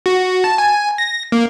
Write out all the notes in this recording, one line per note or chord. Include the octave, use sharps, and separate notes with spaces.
F#4
A5
G#5
A#6
A#3